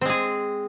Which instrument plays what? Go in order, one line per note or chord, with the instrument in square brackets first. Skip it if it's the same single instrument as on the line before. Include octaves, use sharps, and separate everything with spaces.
[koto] C4
G#3
G#4